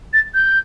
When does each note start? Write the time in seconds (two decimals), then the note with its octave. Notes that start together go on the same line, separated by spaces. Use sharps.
0.13 A6
0.34 G6